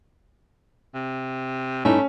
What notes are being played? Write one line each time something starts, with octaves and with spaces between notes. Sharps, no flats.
C3
G2 A3 C#4 D#4 E4